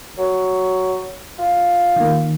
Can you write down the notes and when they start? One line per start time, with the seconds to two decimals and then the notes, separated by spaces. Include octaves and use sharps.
0.18 F#3
1.39 F4
1.96 D#3 A#3